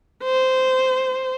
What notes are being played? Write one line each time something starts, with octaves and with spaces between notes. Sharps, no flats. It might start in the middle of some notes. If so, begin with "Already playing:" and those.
C5